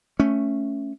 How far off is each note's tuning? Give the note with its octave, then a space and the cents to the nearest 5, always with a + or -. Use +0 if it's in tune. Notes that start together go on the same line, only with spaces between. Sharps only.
A3 +0 C#4 +0